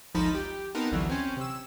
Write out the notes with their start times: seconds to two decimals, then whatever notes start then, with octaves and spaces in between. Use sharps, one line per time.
0.15 G#1 D2 F3 D#4 A5 B5
0.34 G4
0.75 B3 C4 D#4 A#4 A5
0.91 A1 D2 D3 E3 F#3
1.10 C4 C#4
1.37 C3 E6